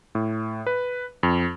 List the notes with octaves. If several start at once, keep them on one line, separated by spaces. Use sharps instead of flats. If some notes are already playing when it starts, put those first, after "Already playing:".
A2
B4
F2